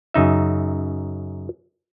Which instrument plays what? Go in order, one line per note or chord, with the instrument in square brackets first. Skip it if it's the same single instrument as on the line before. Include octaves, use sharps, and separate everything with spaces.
[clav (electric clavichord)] F#2 C#3 D#4 E5